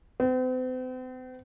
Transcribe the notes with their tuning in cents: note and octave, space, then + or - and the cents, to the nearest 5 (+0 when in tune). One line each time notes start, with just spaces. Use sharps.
C4 -45